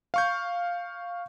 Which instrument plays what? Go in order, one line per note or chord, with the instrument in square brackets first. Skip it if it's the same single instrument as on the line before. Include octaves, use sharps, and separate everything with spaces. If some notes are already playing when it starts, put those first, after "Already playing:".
[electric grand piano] F5 C#6 G6